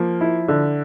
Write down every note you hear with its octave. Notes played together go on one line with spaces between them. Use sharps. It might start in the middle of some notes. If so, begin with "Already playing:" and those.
Already playing: F3 A#3
E4
D3